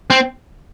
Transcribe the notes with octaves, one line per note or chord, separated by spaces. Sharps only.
C4